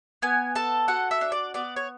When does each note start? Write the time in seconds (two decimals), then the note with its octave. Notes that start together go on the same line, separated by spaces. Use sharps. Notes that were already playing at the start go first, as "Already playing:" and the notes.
0.22 B3 G#5
0.55 A4 A5
0.88 F#4 F#5
1.11 E5
1.21 D4
1.32 D5
1.54 B3 D5
1.76 C#5